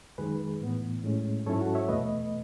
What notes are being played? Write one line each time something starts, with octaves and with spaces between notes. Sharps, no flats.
F#2 D#3 G#3 G#4 B4
A2 E3 B3
A2 G#3 C#4
G#2 F#3 C#4 E4 A4 C#5
F#4 A4
C#5 E5
E2 B2 A3 B4 D#5